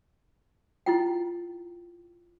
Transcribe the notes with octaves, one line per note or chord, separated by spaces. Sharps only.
E4 F4 G5